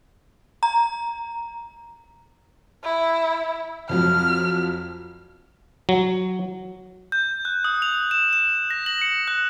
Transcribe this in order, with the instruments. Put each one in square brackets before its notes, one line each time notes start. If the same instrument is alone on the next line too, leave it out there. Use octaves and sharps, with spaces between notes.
[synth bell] A#5
[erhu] E4
[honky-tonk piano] F2 F3 F#3 [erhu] F6
[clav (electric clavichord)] F#3
[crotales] G6
F#6
D#6
F7
E7
E7
A#6
F#7
C#7
F#6